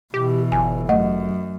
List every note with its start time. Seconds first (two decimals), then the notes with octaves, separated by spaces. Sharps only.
0.14 B2 E3 G4
0.52 G1 G#5
0.89 F#2 A3 D#5 F#5